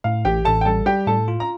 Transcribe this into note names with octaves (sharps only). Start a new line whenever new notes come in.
A2 F5
A1 G4 G5
A1 A4 A5
G5
G3 A4 A5
G3 G4 G5
A2 A4 A5
F4
A#5